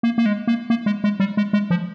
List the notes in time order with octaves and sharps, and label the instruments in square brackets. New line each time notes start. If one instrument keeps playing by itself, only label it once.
[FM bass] A#3
A#3
G#3
A#3
A#3
G#3
G#3
G3
G#3
G#3
F3